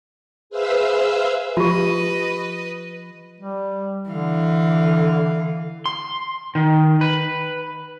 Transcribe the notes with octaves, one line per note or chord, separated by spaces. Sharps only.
G#4 B4 C5 E5 F5 E6
F3 F4 G4 B4 D#5
G3
D3 E3 F5
C6
D#3
B4